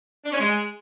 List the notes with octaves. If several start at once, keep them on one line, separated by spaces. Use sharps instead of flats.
D4
C#4
G#3